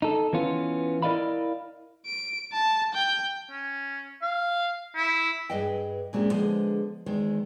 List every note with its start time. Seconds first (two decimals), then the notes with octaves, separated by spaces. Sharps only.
0.02 D#4 A4
0.33 E3 B3 C#4 F4
1.02 E4 A#4 D5 D#5 F5 B5
2.06 D7
2.53 A5
2.94 G5
3.50 C#4
4.22 F5
4.96 E4
5.50 G2 G#4 B4 D#5 F5 G5
6.13 A#2 G#3 C4 C#4 F4 G4
6.32 D3 F3 G#3 B3 G#4 C5
7.06 E2 D#3 G#3 C5